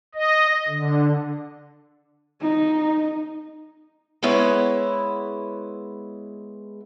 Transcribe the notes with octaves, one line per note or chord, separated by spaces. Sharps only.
D#5
D3
D#4
G#3 B3 E4 C#5